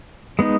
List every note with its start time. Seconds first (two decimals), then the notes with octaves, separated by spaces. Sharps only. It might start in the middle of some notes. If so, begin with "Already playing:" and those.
0.39 G#3 B3 D#4